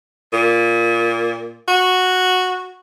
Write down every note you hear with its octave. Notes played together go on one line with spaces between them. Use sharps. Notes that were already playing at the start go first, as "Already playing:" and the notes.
A#2
F#4